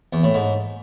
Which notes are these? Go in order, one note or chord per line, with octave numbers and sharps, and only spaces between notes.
E2
A2
G#2